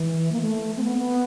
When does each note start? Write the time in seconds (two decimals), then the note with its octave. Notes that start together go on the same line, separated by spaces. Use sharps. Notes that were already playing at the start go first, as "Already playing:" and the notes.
Already playing: E3
0.32 A#3
0.41 A3
0.77 C4
0.83 B3
0.98 B3